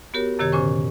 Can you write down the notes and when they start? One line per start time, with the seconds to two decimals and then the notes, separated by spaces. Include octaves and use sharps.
0.14 B3 F#4 G4 A#4 C#5
0.39 F#2 C3 D#3 G4 C#5 G#6
0.52 A#2 D3 C#4 C5 G#5 C#6